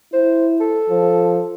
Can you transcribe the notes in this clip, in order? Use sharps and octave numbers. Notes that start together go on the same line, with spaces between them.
E4 C5
A4
F3